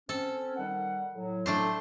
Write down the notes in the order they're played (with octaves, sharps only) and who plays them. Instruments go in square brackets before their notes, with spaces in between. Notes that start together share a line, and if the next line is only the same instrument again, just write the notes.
[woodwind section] C4 C#4 [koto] A4
[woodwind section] D#3 G3 F#5
A2 F#3
[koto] A3 D4 C5